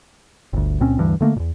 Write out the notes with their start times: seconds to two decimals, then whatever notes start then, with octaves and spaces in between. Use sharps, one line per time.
0.53 G1 D2
0.80 C#2 A#2 C4 C#4
0.98 D2 G2 E3
1.21 D3 A3 A#3
1.36 E2 A#2